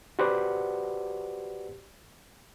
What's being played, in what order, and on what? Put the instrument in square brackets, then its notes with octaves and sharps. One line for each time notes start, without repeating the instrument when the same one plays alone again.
[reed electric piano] F#4 G4 B4 C5 D5 F#5